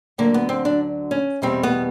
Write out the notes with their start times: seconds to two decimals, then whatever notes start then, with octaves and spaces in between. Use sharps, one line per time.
0.18 D2 D3 F#3 A#3
0.34 B3
0.49 C4
0.65 D4
1.11 C#4
1.42 E2 B2 G3 C4
1.63 B3